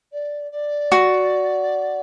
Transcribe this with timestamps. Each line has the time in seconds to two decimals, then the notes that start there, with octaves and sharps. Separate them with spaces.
0.12 D5
0.51 D5
0.92 F#4